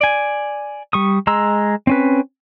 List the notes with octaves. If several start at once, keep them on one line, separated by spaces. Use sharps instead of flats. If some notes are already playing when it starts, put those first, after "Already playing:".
D5 G#5
G3 C#6 D#6
G#3 A#5 C6 E6
C4 C#4 B4